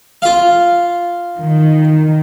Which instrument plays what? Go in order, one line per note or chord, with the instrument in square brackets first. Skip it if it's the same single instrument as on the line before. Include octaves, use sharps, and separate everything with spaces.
[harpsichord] F4 F5
[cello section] D#3